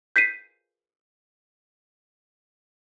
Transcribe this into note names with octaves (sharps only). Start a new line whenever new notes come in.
G6 B6 C7 D#7